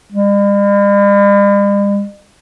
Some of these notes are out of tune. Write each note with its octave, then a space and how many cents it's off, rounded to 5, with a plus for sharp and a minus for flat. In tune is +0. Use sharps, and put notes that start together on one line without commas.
G3 +45